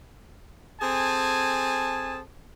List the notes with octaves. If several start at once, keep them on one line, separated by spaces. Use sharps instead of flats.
C4 G#4 A4 G#5 A5